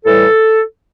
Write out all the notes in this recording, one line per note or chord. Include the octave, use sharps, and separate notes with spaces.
A2 E3 G3 A4